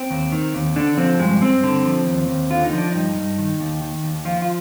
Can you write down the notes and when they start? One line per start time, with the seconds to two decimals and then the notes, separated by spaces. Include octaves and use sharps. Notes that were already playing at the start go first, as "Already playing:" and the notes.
Already playing: C4
0.11 D#2
0.32 D#3
0.54 D#2
0.76 D3 D4
0.97 F3 C4
1.19 G2 G#3
1.42 G2 C4
1.63 D3
1.85 F3
2.07 D#2
2.29 D#2
2.50 D3 F4
2.64 D#4
2.73 F3
2.78 D4
2.92 G2 D#4
3.16 G2
3.38 D#3
3.60 D#2
3.81 D#3
4.04 D#2
4.25 F3 F4
4.42 F4